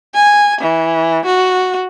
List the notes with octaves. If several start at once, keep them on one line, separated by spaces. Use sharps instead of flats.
G#5
E3
F#4